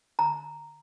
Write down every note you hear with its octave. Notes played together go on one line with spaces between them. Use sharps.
A#5